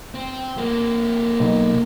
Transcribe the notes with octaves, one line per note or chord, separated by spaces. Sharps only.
C4
A#3 C4
B1